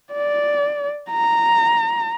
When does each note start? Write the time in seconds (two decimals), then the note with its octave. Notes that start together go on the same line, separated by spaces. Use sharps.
0.13 D5
1.10 A#5